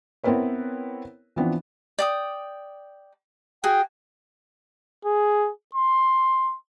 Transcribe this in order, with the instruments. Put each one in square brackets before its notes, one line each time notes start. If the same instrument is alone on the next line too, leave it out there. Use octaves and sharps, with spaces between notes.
[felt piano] B3 C4 E4 A#4 B4 C#5
E3 F3 B3 C4 D4
[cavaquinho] D5 G5 D#6
[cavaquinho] F#4 G#4 [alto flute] G5
[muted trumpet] G#4
C6